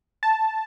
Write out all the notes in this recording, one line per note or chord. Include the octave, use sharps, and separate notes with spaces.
A5